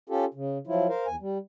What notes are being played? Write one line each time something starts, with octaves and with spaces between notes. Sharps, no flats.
C#4 F4 G4 A4
C#3
F3 F#3 E4 F4
A#4 C5 F5
E2 G#5
G3